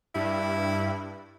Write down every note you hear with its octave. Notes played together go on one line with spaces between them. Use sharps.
G2 E4